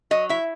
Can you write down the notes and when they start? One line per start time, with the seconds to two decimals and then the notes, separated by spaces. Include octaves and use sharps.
0.11 F#3 D#5
0.29 E4 E5